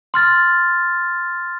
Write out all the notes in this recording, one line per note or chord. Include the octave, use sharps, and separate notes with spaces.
C6 F6 A6